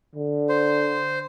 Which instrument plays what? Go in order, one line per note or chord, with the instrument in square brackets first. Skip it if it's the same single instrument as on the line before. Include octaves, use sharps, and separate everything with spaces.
[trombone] D3
[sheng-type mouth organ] C5